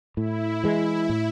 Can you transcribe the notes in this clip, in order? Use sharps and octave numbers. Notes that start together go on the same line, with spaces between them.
A2 E4
E3 G#3
A2